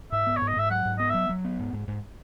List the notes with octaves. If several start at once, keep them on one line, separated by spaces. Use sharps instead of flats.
G#2 E5
B3
C#5
G#2
D#5
G#2 E5
F#3 F#5
G#2
B3 D#5
F#3 E5
F#3
B3
G#2
G#2
G#2